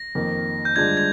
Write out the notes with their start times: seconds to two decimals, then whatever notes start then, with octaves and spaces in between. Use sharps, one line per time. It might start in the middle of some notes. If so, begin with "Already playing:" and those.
Already playing: A#6
0.15 F2 D#3 A#3
0.65 G6
0.76 G2 D3 G#3 D4 F4 G#6
0.97 G#6